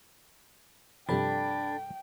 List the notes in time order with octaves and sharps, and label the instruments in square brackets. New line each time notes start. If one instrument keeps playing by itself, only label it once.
[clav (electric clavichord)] G2 C3 F3 [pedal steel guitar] D4 [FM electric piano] A4 B5 [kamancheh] G5